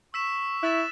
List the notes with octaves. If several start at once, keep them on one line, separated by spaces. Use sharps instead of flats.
C#6 E6 B6 E7
E4 F#6 A6 E7